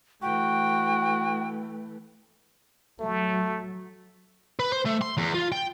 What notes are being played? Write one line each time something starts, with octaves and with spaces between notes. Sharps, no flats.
E3 A3 F#4 G5
F#3 A3
B4
C5
A3
C6
E2
F4
G5